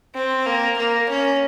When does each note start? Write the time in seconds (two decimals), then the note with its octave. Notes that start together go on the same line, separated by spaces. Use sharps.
0.15 C4
0.46 A#3
0.77 A#3
1.09 C#4